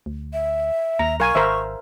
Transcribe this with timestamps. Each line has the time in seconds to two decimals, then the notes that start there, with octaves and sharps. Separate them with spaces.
0.06 D2
0.33 E5
0.99 D#2 A#5
1.20 B1 A#4 F5 G#5 C#6
1.35 G#1 A#4 C5 E5